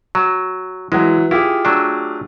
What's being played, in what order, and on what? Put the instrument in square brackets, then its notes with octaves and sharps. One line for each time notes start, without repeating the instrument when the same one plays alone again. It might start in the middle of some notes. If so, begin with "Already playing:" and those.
[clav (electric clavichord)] F#3
[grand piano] E3 F#3 [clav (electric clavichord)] G#3
[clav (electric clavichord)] E4 [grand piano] F4 G4 G#4
[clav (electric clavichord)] F#3 A3 D4